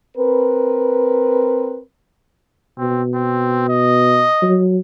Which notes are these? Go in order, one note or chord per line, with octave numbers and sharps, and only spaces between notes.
C4 A#4 B4
B2 C4
C4
D#5
F#3